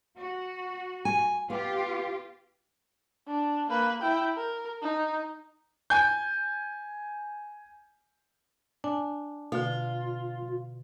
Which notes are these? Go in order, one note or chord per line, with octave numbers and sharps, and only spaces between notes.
F#4
G#5
B3 F4 G4
D4
A#3 B4
E4 G5
A#4
D#4
G#5 G6
D4 G#5
B2 D3 F4